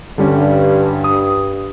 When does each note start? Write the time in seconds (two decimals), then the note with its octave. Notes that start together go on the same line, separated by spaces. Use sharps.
0.18 G2 D3 G3 C#4
1.04 D#6